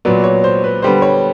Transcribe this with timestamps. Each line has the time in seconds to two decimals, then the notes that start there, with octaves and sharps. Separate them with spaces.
0.05 A#2 F#3 B3 D5
0.24 C#5
0.44 C5
0.64 B4
0.82 D3 G3 B3 C5
1.02 C#5